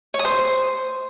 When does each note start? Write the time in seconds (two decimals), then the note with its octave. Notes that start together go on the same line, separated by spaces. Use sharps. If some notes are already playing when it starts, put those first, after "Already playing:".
0.14 C#5
0.19 D#6
0.25 C5